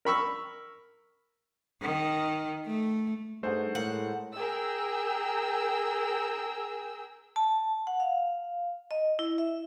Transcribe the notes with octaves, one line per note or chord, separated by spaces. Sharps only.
A#4 B5 C#6 E6
D#3
A3
G2 A3 D#4 G#4 C5 F#5
A2 G#3 A#4 F#5
G#4 A#4 G5 E6
A5
F#5
F5
D#5
E4
E5